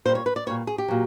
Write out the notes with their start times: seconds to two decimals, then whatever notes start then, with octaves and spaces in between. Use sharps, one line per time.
0.05 A#2 C5
0.09 G3
0.15 C#5
0.26 B4
0.36 D5
0.46 G3 C#5
0.50 A#2
0.67 G#4
0.78 G4
0.88 A#2 F#3